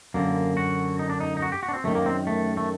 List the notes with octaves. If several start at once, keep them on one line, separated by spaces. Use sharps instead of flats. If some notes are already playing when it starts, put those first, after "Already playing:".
F#2 D3 A#3
F#4
D#4
D4
D#4
D#4
F#4
G4
F#4
D4
C4
F#2 D#3 A3
A#3
C4
A3
A3